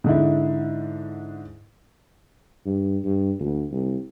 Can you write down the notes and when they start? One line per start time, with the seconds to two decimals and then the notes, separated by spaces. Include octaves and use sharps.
0.04 G#2 D3 E4
2.66 G2
3.05 G2
3.40 D2
3.71 C2